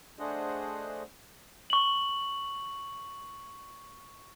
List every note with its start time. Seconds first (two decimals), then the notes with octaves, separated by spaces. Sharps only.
0.19 A3 D4 G#4 C5 D#5 F#5
1.70 C#6 F#7